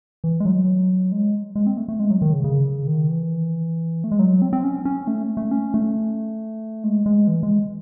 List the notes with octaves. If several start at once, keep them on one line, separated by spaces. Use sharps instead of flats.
E3
G#3
F#3
G#3
G#3
C4
A3
A3
G#3
F#3
D#3
C#3
C#3
D#3
E3
A3
G#3
F#3
C4
C4
C#4
C#4
A3
A3
C#4
A3
G#3
G#3
E3
G#3